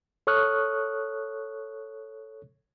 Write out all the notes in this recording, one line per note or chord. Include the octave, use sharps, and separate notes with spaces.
A4 C#5 C#6 D#6 F6 F#6